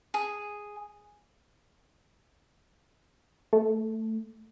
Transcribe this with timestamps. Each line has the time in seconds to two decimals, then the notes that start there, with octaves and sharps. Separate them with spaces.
0.14 G#4
3.53 A3